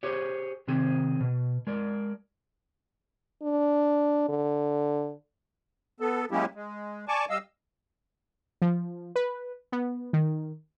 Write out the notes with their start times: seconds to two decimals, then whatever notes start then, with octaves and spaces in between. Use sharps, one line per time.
0.03 G4 G#4 C5 C#5
0.68 C3 D#3 C4 G#4
1.20 B2
1.67 G#3 A#4 D5
3.42 D4
4.29 D3
6.00 B3 A4
6.31 F#3 G#3 A#3 C#4 E4 G4
6.55 G#3
7.08 D5 G#5 A5 C#6 D6
7.30 G3 D#5 F5 E6
8.62 F3
9.16 B4
9.72 B3
10.13 D#3